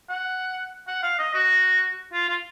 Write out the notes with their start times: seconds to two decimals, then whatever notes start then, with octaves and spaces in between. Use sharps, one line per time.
0.09 F#5
0.88 F#5
1.03 F5
1.19 D#5
1.34 F#4
2.13 F4
2.29 F4